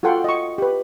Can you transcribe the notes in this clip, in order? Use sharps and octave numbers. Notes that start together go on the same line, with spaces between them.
F4 F#4 A4 F#5 G5 C6
D#5 C#6
G4 B4